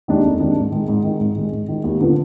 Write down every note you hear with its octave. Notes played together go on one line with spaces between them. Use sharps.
D#2 D#3 G#3 D4
F1
D#2 D#3 G#3 D4
G#2
D#3 G#3
G#2
D#3 G#3
G#2
D#3 G#3
G#2
D#3 G#3
D#2
D3 F3 B3